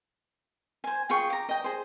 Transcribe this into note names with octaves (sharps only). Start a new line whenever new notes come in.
C5 G#5
F4 G#4 G5 C#6
A#5 D6
D#5 G5
G#4 C5